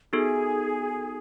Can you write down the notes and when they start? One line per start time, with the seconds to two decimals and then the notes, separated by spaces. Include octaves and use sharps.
0.13 B3 D#4 F#4 G#4 A4